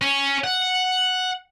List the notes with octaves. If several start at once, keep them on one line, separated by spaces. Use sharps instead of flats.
C#4
F#5